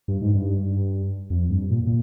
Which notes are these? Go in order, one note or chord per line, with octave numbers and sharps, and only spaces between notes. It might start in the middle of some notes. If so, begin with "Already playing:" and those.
G2
G#2
G2
F2
G2
A#2
A#2